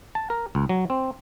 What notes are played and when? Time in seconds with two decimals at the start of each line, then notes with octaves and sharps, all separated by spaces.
0.15 A5
0.30 A#4
0.55 C#2
0.69 F#3
0.90 C4